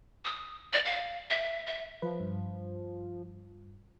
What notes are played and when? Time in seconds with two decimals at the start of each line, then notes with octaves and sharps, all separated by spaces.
0.25 D#6
0.73 D5
0.85 F5
1.30 E5
1.67 E5
2.02 F3 B4
2.20 G2